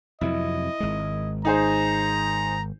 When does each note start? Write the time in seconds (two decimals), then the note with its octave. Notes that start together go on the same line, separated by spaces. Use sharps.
0.21 F2 C3 F#3 E4 D#5
0.80 G#1 G#3
1.45 D#4 G#4 C5 A#5